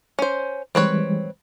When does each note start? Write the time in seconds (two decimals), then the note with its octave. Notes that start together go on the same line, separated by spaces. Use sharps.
0.19 C#4 C5
0.75 E3 G3 G#3 C4 B4 C#5